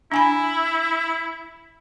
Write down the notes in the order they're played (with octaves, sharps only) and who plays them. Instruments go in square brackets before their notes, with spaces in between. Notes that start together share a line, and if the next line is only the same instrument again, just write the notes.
[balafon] D4 G#5 B5 [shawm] E4